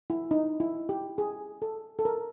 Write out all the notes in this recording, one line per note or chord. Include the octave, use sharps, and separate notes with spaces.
E4
D#4
E4
G4
G#4
A4
A4
A#4